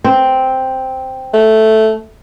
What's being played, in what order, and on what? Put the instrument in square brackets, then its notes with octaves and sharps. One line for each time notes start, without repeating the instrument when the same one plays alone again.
[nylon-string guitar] C4
[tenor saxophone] A3